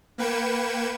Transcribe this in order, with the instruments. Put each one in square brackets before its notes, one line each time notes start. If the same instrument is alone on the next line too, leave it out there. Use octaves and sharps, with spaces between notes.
[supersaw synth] A#3 B4 G5 G#6 C#7 E7